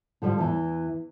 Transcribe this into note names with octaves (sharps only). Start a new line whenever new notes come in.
D3 F3 G3
E2 E3